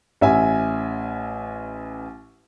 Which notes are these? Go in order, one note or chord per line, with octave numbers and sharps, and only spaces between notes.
A1 E5 G#5